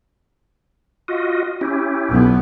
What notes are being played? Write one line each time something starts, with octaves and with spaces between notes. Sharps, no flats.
F4 F#4 D#5
C#4 E4 G4
B1 B3